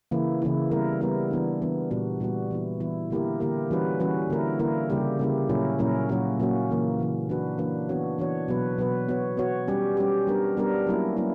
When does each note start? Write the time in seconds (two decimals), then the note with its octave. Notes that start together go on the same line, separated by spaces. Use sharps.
0.11 C#3 E3 A#3 E4
0.42 C#3 E3 A#3 E4
0.71 G3 B3 E4 A#4
1.01 G3 B3 E4 A#4
1.31 E3 B3 D4
1.62 E3 B3 D4
1.91 A#2 G3 B3 F#4
2.20 A#2 G3 B3 F#4
2.51 E3 B3 E4
2.80 E3 B3 E4
3.11 D3 A#3 E4 G4 A#4
3.40 D3 A#3 E4 G4 A#4
3.70 E3 G3 C#4 F#4 B4
4.00 E3 G3 C#4 F#4 B4
4.30 D3 A#3 E4 A#4
4.59 D3 A#3 E4 A#4
4.90 C#3 G3 A#3 E4 G4
5.19 C#3 G3 A#3 E4 G4
5.49 A#2 F#3 C#4 E4 A#4
5.79 A#2 F#3 C#4 E4 A#4
6.09 A#2 F#3 A#3 C#4 F#4
6.40 A#2 F#3 A#3 C#4 F#4
6.69 C#3 E3 A#3
6.99 C#3 E3 A#3
7.29 E3 A#3 D4 F#4 B4
7.58 E3 A#3 D4 F#4 B4
7.89 E3 B3 D4 F#4 C#5
8.18 E3 B3 D4 F#4 C#5
8.48 B2 F#3 B3 F#4 B4
8.78 B2 F#3 B3 F#4 B4
9.08 B3 F#4 C#5
9.37 B3 F#4 C#5
9.68 G3 C#4 G4
9.97 G3 C#4 G4
10.27 G3 B3 D4 A#4
10.57 G3 B3 D4 A#4
10.87 F#3 A#3 C#4 E4
11.17 F#3 A#3 C#4 E4